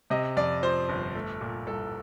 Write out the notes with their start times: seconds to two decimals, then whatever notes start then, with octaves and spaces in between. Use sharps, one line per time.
0.10 C3 D#5
0.37 F2 D5
0.63 F3 C5
0.89 G1
1.15 A3
1.41 A#2
1.67 C2 A4